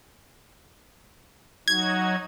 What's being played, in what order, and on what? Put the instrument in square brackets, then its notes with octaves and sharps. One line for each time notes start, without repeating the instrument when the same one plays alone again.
[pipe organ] F#3 D#4 F#4 [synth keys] G#6